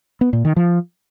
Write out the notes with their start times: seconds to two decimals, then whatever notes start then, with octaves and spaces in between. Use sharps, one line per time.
0.21 B3
0.33 A#2
0.45 D#3
0.56 F3